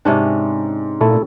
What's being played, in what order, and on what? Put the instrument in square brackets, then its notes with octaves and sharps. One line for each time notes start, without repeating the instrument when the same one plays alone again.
[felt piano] G#2 [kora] C3 C#4 D4
[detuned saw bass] A#2 [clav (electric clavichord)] A3 E4 A4